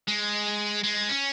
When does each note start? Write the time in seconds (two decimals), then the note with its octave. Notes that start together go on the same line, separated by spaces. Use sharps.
0.08 G#3
0.84 G#3
1.09 C#4